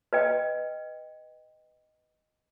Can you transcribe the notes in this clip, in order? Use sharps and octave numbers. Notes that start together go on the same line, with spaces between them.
B4 D#5 G5